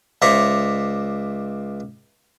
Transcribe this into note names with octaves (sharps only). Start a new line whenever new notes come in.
C#2 C5 D5 E5 A#5 C#6